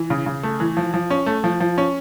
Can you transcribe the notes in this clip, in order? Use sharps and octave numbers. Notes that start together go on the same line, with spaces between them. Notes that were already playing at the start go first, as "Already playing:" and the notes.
Already playing: E3
C#3
C#3
A3
E3
F3
F3
C#4
A3
F3
F3
C#4